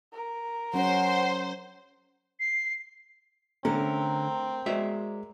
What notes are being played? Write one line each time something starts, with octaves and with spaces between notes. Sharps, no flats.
A#4
F#3 C#4 C5 F#5
C7
D3 A3 C4 C#4 A#4
G#3 F#4 C5 D5 E5